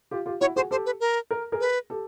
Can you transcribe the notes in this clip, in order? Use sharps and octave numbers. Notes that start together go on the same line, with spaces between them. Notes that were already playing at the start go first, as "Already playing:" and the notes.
F4 G4
F4 G4
E4 F#4 C#5
F#4 G#4 C5
G4 A4 C5
B4
A#4
A#4
G#4 A#4
B4
G4 A4